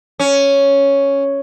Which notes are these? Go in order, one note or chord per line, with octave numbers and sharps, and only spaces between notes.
C#4